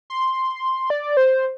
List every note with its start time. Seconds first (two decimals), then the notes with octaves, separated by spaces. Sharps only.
0.10 C6
0.90 D5
1.17 C5